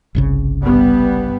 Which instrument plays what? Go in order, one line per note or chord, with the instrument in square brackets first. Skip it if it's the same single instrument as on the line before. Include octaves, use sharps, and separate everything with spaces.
[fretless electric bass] G1 C2 C#3
[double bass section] G2 G3 B3